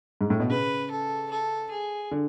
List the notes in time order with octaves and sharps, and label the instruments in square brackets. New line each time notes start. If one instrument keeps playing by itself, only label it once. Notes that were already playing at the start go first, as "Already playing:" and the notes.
[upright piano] G#2
A2
B2
[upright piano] C#3 [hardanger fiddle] B4
[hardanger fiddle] A4
A4
G#4
[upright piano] D3